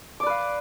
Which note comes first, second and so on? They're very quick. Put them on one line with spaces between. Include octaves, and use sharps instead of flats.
D6 D5 B4 F5